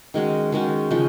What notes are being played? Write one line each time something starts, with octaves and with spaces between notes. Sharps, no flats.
D#3 G#3 C#4 F#4
D#3 G#3 C#4 F#4
C#3 F3 G#3